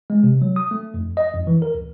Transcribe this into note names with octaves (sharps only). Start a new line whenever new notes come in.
G#3
C3
F#3
D#6
A3
F2
D#5
F2
E3
A#4
D2